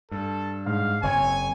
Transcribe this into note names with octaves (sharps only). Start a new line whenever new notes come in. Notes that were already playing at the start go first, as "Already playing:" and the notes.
G2 A4
G#2 F5
F#1 C4 C#5 G#5